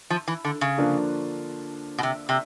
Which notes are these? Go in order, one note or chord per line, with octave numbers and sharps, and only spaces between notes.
F3
E3
D3
C#3
D3 F3 A#3 D4 F4
B2
C3
C3